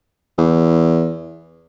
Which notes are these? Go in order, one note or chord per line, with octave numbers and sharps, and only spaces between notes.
E2